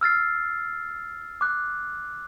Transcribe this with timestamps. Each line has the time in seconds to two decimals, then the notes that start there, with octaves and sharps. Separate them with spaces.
0.01 E6 F6 A6 C7
1.41 D6 F#6